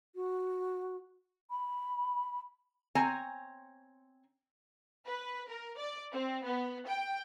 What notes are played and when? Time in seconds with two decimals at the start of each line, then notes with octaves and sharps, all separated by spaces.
0.15 F#4
1.50 B5
2.95 C4 C#5 G#5 A#5
5.05 B4
5.48 A#4
5.78 D5
6.12 C4
6.44 B3
6.87 G5